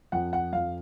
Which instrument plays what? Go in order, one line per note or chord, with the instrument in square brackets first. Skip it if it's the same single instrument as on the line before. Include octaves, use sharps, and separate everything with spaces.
[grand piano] F2 F#5
F#5
F2 F5